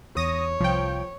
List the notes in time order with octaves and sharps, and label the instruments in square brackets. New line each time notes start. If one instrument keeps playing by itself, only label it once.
[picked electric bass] E2 [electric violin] C#5 [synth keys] D#6 A#6
[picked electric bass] C2 [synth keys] F3 G5